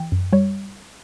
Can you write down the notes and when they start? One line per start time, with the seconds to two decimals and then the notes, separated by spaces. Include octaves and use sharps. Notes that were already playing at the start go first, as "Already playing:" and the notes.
Already playing: E3 G5
0.12 F#2
0.33 G3 C#5